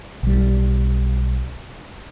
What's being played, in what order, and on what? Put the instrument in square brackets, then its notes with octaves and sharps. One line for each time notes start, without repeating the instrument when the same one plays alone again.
[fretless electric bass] B1 G3